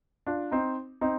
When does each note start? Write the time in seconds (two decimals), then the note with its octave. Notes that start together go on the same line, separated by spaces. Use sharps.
0.27 D4 F4
0.52 C4 D#4
1.01 C4 D#4